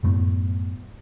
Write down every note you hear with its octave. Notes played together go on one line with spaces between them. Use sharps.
F#2 A2 A3 B3